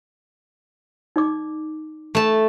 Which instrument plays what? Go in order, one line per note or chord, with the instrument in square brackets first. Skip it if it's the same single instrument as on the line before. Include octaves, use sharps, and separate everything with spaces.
[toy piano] D#4 D5 D6
[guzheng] A3 A5